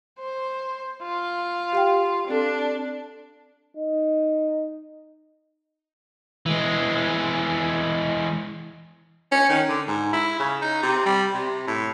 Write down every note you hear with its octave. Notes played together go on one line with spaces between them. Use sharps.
C5
F4
G4 F5 G5
C4 D4 A4
D#4
E3 G#3
C#4
D#3
D3
G#2
E4
C#3
D#4
C3
G3
C3
A2